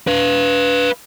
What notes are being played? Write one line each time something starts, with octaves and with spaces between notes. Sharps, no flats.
B4 F5